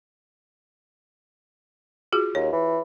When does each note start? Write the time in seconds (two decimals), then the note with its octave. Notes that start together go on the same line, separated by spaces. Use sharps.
2.12 F4 F#4 G#4
2.35 D#2 C#5
2.52 E3